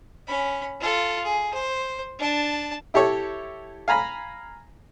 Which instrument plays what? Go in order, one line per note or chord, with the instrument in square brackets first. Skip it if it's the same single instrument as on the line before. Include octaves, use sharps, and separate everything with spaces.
[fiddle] C#4 B5
F4 A4
G#4
C5
D4 A5
[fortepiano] E4 G4 A4 C#5
F5 G#5 A#5 B5